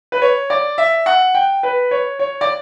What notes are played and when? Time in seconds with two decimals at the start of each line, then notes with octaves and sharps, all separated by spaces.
0.12 B4
0.22 C#5
0.50 D5
0.78 E5
1.06 F#5
1.35 G5
1.63 B4
1.91 C#5
2.19 C#5
2.41 D5